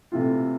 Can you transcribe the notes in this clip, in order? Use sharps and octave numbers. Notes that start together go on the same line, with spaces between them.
C3 E3 A3 C4 F4